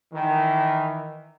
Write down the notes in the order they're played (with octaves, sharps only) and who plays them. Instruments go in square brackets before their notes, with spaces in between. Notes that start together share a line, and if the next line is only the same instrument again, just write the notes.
[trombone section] D#3 E3